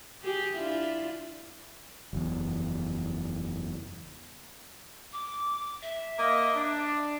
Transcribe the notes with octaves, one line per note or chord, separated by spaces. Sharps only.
G4 G#4
D4 E4 F4
F#1 E2
D6
E5
A#3 D#5
D4